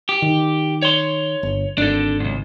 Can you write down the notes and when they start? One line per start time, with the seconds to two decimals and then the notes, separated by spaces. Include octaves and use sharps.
0.09 G4
0.22 D#3
0.82 C#5 C6
1.43 G1
1.78 G#1 D4 A4
2.20 C#2 G#2